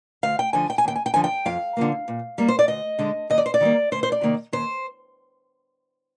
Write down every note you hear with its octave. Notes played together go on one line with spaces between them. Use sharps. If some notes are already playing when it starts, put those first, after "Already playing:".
D2 F5
G5
D3 F3 G#5
G5
G#5
D#2 G5
G#5
G5
D3 F3 G#5
G5
F2 F5
D3 F3 A#3
A#2
G3 A#3
C5
D5
D2 D#5
D3 G#3
D#2 D#5
D5
C5
D5
D#3 G3 A#3
D2 C5
C5
D5
C3 D#3 A#3
D#2 C5